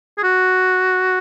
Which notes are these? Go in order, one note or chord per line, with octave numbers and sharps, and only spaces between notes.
G#4
F#4